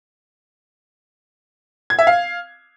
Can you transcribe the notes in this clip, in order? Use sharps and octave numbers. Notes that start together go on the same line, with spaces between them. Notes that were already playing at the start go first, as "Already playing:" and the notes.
G#6
E5
F5